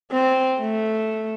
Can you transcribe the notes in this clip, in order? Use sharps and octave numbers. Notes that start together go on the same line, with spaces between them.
C4
A3